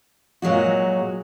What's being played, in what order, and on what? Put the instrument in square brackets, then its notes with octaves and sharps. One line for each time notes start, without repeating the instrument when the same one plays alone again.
[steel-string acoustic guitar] A#2 F#3 G#3 F#4